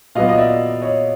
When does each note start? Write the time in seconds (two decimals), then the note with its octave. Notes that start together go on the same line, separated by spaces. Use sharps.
0.15 A#2 F#3 B3 D#5 F5
0.29 D#5
0.38 D5 E5
0.82 C#5 D#5